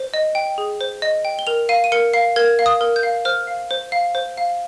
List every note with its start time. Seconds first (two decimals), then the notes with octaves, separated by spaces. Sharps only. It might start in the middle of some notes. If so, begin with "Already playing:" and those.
Already playing: C5
0.14 D#5
0.35 G5
0.58 G#4
0.81 C5
1.02 D#5
1.25 G5
1.39 G7
1.47 A#4 F7
1.69 F5 D#7
1.84 D#7
1.92 A#4 C#7
2.13 F5 C7
2.36 A#4 G#6
2.59 F5
2.66 D#6
2.81 A#4
2.96 G6
3.03 F5
3.25 C5 F6
3.47 F5
3.71 C5
3.92 F5
4.15 C5
4.37 F5